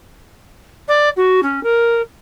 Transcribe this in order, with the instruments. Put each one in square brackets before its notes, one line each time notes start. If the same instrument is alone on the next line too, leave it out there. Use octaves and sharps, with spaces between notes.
[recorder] D5
F#4
C#4
A#4